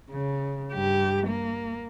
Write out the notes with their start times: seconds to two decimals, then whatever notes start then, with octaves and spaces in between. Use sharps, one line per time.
0.10 C#3
0.74 G2 G4
1.28 A#3